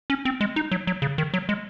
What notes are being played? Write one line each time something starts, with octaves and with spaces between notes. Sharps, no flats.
C#4
C4
G#3
D#4
F#3
F#3
C#3
D#3
F#3
G#3